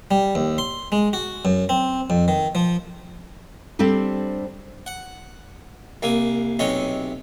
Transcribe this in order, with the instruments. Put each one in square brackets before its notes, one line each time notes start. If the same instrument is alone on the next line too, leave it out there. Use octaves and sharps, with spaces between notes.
[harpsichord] G3
D#2
C6
G#3
F#4
F#2
C4
F2
D#3
F3
[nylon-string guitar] G3 C4 D4 G4 A4
[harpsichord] F#5
C2 A#3 G#5
B1 C3 C#4 D#5